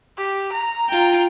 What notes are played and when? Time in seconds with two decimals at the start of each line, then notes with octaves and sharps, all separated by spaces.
0.18 G4
0.53 A#5
0.89 F4 G5